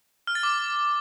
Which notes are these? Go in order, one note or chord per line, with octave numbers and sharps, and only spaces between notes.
F6
A6
D6